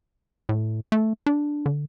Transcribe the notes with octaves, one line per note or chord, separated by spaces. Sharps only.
A2
A3
D4
D3